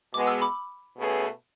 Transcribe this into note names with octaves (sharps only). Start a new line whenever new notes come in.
B2 G#3 B3 D6
E6
B5 D6
B2 A3 C#4 G#4 B4